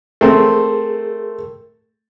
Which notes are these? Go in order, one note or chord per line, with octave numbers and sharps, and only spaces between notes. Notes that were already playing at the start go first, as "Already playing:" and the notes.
A3 C4 G#4 A#4